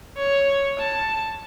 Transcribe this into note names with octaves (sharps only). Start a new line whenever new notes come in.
C#5
A5